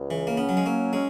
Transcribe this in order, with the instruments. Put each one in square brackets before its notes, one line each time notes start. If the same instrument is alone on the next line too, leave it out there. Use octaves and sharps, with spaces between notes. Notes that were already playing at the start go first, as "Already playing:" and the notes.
Already playing: [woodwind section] C#2
[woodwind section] C#3 [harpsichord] E3
[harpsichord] A#3
[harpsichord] B3 [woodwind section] C#4
[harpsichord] F#3
G#3
[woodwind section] F#3 [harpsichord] A#3
[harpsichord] G#3 [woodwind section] C#4